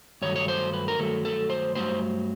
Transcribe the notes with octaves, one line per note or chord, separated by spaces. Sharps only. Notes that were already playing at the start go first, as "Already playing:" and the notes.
G2 D#3 F#3 A3 C#5
C#5
C5
B4
A#4
G2 D#3 F#3 A3 A4
A4
C5
G2 D#3 F#3 A3 C5